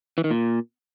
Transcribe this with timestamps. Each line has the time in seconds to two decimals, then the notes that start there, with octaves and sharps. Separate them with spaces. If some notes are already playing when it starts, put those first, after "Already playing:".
0.18 E3
0.24 D#3
0.31 A#2